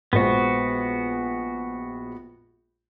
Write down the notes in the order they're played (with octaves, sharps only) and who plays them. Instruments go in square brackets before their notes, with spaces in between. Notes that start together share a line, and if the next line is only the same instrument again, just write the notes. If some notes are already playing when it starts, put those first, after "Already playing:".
[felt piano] A#1 G#3 C5 [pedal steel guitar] B3 F#4